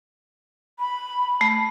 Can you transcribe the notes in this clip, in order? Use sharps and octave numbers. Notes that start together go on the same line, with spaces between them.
B5
A3